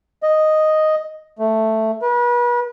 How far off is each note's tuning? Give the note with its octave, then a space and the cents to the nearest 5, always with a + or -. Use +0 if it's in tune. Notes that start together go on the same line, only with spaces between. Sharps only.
D#5 +0
A3 +5
B4 -35